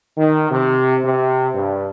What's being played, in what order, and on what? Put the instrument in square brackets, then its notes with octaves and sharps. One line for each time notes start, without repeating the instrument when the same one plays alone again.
[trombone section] D#3
C3
C3
G2